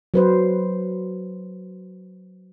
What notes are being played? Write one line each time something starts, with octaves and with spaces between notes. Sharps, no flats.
F#3 B4 C5